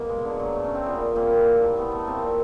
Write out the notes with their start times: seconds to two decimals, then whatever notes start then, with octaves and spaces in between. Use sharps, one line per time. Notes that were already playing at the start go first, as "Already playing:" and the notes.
Already playing: B2 A#3
0.09 G#3
0.25 D3
0.39 F#3
0.55 A3
0.65 C#4
0.70 F#3
0.75 C4
0.86 A#2 B3
1.01 A#2
1.15 A#2 A#3 C4
1.31 G3
1.47 A2
1.61 A2
1.77 A3 B3
1.92 A3
2.06 A3 A#3 C4
2.22 A#2